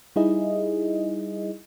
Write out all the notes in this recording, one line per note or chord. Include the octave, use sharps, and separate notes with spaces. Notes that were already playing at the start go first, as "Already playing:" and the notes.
G3 D#4 E4 G#4 D#5